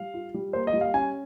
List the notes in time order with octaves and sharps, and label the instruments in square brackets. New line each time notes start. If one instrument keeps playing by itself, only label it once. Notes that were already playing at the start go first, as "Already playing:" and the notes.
Already playing: [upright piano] G3 [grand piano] F5
[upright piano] F4
G3
[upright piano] A#3 [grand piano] C5
[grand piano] D#5
[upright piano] G3
[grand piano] F5
[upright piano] C#4 [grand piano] G#5